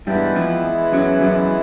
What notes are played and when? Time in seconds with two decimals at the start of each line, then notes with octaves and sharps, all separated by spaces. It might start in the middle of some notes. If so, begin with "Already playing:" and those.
0.07 G2 E3 G3 G#3 B3 E4
0.35 F2 F3
0.92 F#2 F#3
1.21 F#2 F#3